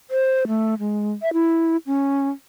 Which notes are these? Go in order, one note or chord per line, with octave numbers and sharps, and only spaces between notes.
C5
A3
G#3
E5
E4
C#4